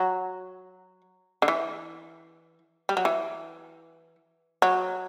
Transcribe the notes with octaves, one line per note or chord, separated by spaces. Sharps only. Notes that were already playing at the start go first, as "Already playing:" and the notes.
Already playing: F#3
D3
E3
G3
F#3
E3
F#3